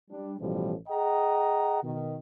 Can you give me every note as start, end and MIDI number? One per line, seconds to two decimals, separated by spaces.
0.11 0.35 55
0.11 0.35 62
0.40 0.74 33
0.40 0.74 47
0.40 0.74 52
0.40 0.74 53
0.40 0.74 55
0.89 1.80 68
0.89 1.80 75
0.89 1.80 78
0.89 1.80 79
0.89 1.80 82
1.83 2.17 47
1.83 2.17 51